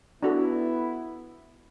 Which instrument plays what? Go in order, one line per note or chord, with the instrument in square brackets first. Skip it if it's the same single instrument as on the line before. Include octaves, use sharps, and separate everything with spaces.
[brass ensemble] B3 E4 [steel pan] D4 F#4 A4